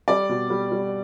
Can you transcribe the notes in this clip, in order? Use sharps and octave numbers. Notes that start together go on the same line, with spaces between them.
G3 D5
B2
G3
G3